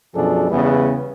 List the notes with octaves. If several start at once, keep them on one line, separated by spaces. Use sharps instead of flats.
F#2 B2 F3 D4 G#4 A4
E2 C#3 G3 B3